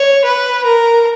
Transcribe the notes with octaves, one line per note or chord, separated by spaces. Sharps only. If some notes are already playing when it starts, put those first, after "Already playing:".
Already playing: C#5
B4
A#4